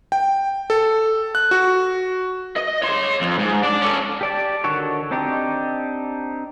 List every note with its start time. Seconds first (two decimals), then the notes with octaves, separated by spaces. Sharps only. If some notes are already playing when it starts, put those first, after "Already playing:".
0.12 G5
0.70 A4
1.35 F#6
1.51 F#4
2.56 D#5
2.82 C#5 C6
3.21 F2
3.39 G#2
3.63 D4 D5
3.82 C#4 A4
4.21 G4 D5 A5
4.64 D3 D#3 F#4 A4 C#5
5.11 C4 D4 D#4 G4